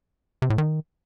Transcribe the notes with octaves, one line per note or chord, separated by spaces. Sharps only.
C3
A2
D#3